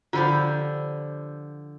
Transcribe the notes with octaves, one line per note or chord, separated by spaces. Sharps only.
D3 F3 F4 G4 B5